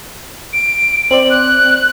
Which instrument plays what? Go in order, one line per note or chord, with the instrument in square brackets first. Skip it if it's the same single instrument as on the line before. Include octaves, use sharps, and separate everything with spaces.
[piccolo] D7
[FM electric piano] C4 C5 D5 [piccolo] F#7
[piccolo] F#6